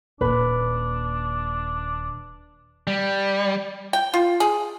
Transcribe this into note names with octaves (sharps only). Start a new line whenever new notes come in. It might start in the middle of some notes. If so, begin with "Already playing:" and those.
D#1 D#2 A#2 D4 B4 B5
G3
G5
F4
G#4